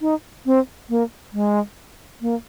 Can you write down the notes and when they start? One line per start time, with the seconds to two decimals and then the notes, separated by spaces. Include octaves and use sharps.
0.01 D#4
0.46 C4
0.89 A#3
1.33 G#3
2.21 A#3